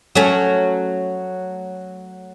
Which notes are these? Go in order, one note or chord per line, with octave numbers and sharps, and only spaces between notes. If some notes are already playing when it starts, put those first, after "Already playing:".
F#3 A3 C#4